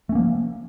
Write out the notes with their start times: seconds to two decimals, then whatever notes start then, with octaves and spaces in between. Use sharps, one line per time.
0.09 A3
0.12 C#4
0.15 A#3
0.18 F3